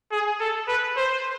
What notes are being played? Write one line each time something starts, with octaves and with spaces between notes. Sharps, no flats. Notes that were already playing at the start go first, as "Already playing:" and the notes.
G#4
A4
B4
C5